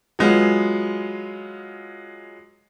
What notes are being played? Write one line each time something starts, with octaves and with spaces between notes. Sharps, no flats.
F#3 G#3 B3 F4